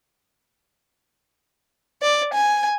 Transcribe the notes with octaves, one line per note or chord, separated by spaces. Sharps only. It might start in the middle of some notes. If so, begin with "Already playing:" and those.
D5
G#5